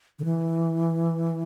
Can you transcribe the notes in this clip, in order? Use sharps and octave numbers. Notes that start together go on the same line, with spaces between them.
D3
E3